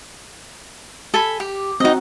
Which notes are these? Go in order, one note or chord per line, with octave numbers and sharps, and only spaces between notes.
A4 G#5 B5
G4
C4 D#4 F#4 D#5